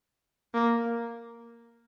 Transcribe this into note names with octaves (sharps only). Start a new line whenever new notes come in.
A#3